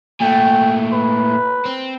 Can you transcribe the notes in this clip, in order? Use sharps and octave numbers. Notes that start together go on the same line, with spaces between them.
A#2 A3 G5
B4
C4